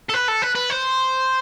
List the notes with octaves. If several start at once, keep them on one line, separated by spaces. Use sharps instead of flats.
A4
B4
A4
B4
B4
C5